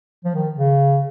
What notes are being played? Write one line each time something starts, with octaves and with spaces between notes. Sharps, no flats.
F3
D#3
C#3